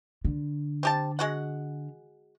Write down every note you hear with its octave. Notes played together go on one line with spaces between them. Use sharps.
D3
C4 G4 A5
G#3 F#4 F#5